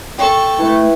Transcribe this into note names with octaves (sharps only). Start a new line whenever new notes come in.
A4 G5 C#6
A3 E4 B4